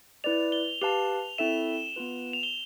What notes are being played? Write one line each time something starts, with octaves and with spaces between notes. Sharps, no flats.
E4 B4 D5 F7
G7
G4 B4 F5 A5 F7
C4 E4 A4 E5 E7
B3 F4 B4
F7
G7